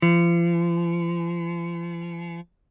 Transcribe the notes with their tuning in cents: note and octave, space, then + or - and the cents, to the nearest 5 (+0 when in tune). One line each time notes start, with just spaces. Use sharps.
F3 -40